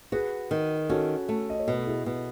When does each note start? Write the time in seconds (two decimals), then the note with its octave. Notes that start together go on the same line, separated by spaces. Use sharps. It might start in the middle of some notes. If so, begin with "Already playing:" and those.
0.12 F#4 G#4 B4
0.51 D#3
0.89 C#4 F#4 A4
1.29 A3
1.50 D#5
1.59 C#5
1.68 B2 B4
1.77 A4
1.87 E4 G#4
2.06 B2